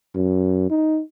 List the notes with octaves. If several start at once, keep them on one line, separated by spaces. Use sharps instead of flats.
F#2
D#4